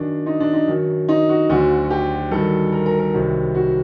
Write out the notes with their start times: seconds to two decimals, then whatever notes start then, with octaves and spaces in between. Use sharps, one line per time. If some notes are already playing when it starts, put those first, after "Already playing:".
Already playing: F#2 D#3 F#3 D4
0.26 D#4
0.40 D4
0.54 D#4
0.68 F#2 D#3 F#3
1.09 D#4
1.29 F#4
1.50 D2 D3 F#3 F#4
1.90 G4
2.31 G2 D#3 F#3 A4
2.72 A#4
2.86 A#4
2.99 A#4
3.13 C2 C3 D#3 F#3
3.55 F#4